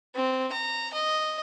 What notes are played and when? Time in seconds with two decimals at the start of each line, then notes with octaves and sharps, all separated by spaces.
0.15 C4
0.52 A#5
0.93 D#5